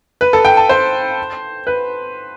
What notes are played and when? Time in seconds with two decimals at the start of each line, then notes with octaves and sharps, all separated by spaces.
0.21 B4
0.33 A4
0.45 G5
0.57 A5
0.69 C5
1.67 B4